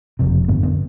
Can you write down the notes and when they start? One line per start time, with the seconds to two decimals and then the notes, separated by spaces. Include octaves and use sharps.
0.19 F#1 F2 C3
0.48 A1 G2 D3 B3
0.63 B3